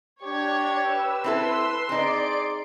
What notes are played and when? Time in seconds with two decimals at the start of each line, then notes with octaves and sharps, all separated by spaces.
0.23 D4 G4 C#5 G#6
0.82 B4 E6
1.24 C4 E4 A4 C6
1.89 C4 D#4 G#4 D5 D7